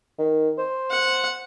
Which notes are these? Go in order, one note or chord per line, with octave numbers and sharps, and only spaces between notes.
D#3
C5
F#5